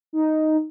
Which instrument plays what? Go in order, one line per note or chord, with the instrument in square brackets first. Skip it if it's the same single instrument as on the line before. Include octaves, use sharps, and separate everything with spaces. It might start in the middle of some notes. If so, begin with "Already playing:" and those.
[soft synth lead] D#4